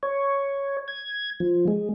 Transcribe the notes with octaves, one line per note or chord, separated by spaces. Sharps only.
C#5
G#6
F3
G#3